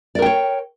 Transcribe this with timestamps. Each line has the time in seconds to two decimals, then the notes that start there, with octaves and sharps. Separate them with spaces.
0.15 D5
0.19 A#4
0.22 G5
0.26 C#5